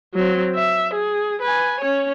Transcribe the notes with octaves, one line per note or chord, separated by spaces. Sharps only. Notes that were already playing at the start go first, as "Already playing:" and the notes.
F#3 C4
E5
G#4
B4 G#5
C#4 C#5